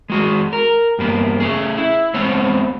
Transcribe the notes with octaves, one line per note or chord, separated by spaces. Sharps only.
G#3 F#4 G#4
A#4
G2 A#3 B3
A3 C#4 G#4
E4
G#3 B3 C4 C#5